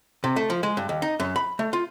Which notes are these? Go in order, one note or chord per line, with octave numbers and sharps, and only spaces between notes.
C3
A3
F3
G#3
G2
D#2
D#4
F#2
B5
A3
F4